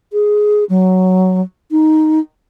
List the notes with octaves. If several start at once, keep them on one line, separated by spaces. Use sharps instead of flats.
G#4
F#3
D#4